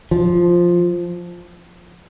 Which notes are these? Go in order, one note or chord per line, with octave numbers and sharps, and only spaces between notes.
F3